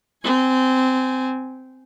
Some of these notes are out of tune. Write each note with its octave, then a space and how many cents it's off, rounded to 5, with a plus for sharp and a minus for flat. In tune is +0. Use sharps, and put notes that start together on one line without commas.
C4 -15 G#5 +0